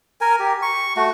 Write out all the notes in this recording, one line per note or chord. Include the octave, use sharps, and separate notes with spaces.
A#4 G#5
G4
C#6
A3 F#4